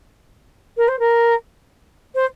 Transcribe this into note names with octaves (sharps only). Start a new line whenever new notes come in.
A#4
C5
A#4
C5